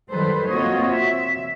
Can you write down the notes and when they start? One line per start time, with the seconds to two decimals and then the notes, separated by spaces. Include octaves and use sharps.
0.11 D#3 F#3 G3 A4 B4 C5
0.50 A#3 C4 F4 F#4 C#5 D#5
0.91 E5